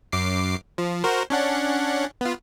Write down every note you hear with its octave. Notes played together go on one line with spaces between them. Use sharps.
F#2 D6 C7
F3
F#4 A#4 C5
C#4 D4 F#5
B3 F4